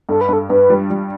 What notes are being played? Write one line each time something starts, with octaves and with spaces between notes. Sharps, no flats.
G2 A4
B4
G2 A4
G2 B4
G3
G3